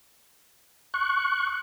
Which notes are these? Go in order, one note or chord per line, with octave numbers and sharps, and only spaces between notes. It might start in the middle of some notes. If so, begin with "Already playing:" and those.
C#6 F#6